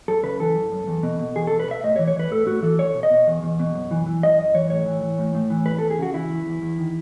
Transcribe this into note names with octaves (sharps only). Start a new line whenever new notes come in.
F#2 A4
C#3 B4
E3 A4
F#2
F#2
E2
B2
B2
E2 G#4
E2 A4
B4
B2 E5
A2 D#5
C#5
E3
C#5
E3 B4
A2 A4
A2 F#4
E3 A4
E2 C#5
B2
D#5
B2
E2
E2
B2
F#2
E3
E3
F#2 D#5
F#2 D#5
E3 C#5
A2 C#5
E3
E3
A2
A2
E3
E2 B4
E2 A4
G#4
C#3 F#4
E3 E4
E2
E2
E2
D#3